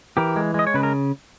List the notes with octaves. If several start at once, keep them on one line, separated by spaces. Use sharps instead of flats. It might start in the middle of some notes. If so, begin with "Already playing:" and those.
E3 G4 A#4
G#3
G#3 D#5
C#5
C#3 B4
A#4